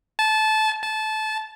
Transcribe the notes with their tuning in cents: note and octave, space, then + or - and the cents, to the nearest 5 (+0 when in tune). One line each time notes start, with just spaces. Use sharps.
A5 -20
A5 -20